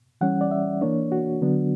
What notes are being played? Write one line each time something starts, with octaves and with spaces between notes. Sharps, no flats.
E3 G3 C#4 F#5
D5
E5
E3 A#3 D4 C#5
F#4
D3 F#3 B3 D4